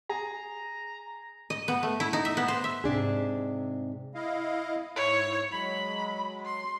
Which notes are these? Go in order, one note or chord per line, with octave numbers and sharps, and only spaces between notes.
G#4 A#5
D#5
B3
A3
E4
D#4
E5
B3
C5
E5
G#2 C3 D4 G#4
E4 D#5 F5
G#2 E4 C#5
F#3 G#3 B5
C6